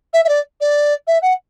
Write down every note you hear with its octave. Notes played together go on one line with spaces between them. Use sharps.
E5
E5
D5
D5
E5
F#5